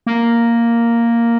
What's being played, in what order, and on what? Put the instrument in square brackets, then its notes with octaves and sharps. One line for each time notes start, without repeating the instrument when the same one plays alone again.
[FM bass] A#3